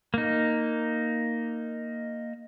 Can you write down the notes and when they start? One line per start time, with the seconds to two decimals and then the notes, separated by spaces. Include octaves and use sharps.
0.14 A#3 D#4